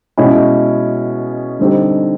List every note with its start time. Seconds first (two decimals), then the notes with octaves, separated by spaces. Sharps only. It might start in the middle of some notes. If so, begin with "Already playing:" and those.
0.18 B2 G#3 C#4 E4
1.59 D3 G3 C4 D#4 G4